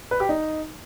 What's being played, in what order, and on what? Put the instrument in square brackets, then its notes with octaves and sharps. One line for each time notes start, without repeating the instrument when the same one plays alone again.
[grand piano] B4
G4
D#4